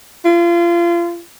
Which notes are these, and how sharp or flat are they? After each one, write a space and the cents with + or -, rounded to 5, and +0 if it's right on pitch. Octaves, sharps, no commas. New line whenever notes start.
F4 -30